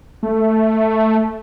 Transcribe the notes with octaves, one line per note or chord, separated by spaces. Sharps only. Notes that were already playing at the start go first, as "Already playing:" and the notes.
A3